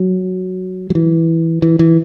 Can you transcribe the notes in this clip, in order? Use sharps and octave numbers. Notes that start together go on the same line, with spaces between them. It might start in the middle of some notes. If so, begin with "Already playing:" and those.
Already playing: F#3
F#3
E3
E3
E3